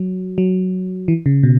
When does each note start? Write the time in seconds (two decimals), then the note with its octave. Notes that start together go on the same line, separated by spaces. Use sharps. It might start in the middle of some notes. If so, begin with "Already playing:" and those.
Already playing: F#3
0.38 F#3
1.08 E3
1.26 C#3
1.43 B2